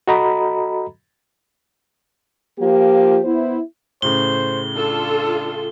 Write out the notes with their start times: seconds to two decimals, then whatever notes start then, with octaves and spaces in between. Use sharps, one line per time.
0.08 F#4 A4 D#5 A#5 B5
2.60 F3 A#3 F4 G4
3.25 B3 E4 C5
4.02 A2 C#3 C5 G7
4.75 D4 F4 A4